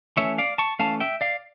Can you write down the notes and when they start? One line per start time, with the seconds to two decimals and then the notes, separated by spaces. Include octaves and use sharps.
0.17 E3 A3 C#4 C#5 E5
0.38 D5 F5
0.58 A5 C#6
0.79 E3 A3 C#4 F5 A5
1.00 E5 G5
1.21 D5 F5